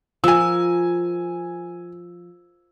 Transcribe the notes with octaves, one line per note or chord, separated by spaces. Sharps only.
F3 A#4 G#5 E6